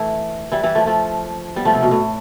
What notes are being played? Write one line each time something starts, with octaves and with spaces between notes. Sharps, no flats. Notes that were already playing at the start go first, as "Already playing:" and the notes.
Already playing: E3 A3
E3 G3
E3 G3
F3 A3
F3 A3
G3 B3
F3 A3
C3
B2
A2